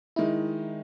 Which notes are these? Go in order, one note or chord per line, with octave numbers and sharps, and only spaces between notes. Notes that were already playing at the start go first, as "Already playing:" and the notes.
D#3 G#3 D#4 E4